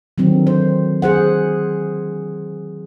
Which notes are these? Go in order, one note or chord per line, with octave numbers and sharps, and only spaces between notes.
D3 D#3 F#3 C4
C5
G#4 C5 F#5